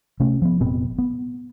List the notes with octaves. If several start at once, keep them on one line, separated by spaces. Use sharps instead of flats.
C3 A3 C#4
F3 B3
F1 A#2 B3 C4
B3